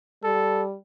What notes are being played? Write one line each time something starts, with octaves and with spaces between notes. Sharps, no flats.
G3 A4